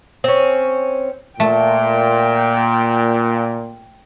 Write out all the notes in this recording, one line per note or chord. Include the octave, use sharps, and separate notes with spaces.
C4 C#4
A#2 A3 G5